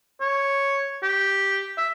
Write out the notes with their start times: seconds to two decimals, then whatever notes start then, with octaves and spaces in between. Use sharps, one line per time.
0.20 C#5
1.03 G4
1.77 E5